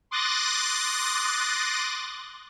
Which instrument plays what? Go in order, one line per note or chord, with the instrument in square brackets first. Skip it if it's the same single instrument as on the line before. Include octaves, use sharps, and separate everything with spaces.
[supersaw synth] C6 D6 D#6 F#6 A6 A#6